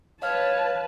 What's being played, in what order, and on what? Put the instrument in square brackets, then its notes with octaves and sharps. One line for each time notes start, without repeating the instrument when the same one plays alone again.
[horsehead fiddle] B4 A5 [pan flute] C#5 [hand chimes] D#5 F5 F6